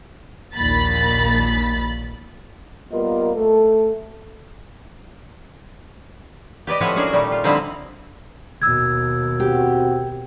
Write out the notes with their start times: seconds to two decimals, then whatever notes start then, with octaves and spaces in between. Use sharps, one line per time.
0.56 A#1 D#2 A#2 D#3 B5 A6
2.92 G3 A#3 B3 F4 A#4 D#5
3.35 A3 A4
6.67 G4 B4 D5 D#5
6.81 A2 F3 C4 B4 C#5 F#5
6.96 C#4 D4 F#4 G#4 A#4
7.12 A#2 D#3 G3 A3
7.32 F4
7.44 D3 F3 G3 C4 D#4 E4
8.62 D#2 B2 E6 G#6
9.40 C4 F#4 G4